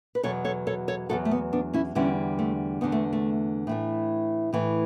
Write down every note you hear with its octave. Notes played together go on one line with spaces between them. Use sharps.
B4
E2 B2 F#3 A4 C#5
A4 C#5
A4 C#5
A4 C#5
E2 B2 F#3 F#4 A4
A3
B3
B3 D4
C#4 E4
E2 D3 G3 C#4 E4
A3
E2 D3 G3 B3
A3
A3
A2 E3 A3
A2 E3 A3